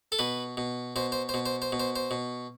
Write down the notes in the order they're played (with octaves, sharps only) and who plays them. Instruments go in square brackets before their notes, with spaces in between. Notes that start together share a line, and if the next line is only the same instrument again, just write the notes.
[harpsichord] A4
B2 B4
B2
B2 C5
C5
C5
B2
C5
C5
B2
C5
C5
B2